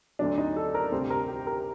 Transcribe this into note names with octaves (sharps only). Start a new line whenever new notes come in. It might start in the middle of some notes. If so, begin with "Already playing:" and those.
D2 D3 F#3 D4
D#4
A4
A#4
D2 C3 G3 C5
A#4
G4
A#4